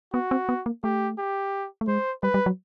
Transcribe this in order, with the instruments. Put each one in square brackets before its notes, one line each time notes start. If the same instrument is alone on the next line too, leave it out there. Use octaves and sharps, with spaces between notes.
[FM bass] B3 [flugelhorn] F#4
[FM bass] C4
B3
A#3
[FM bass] A3 [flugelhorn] G4
[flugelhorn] G4
[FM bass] A3
[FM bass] G#3 [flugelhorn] C5
[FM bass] G3 [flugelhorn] B4
[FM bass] G3
F#3